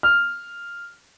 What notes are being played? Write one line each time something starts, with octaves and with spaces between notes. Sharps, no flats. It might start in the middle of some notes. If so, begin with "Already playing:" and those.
F6